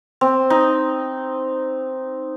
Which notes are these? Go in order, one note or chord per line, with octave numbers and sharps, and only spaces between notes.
C4
D#4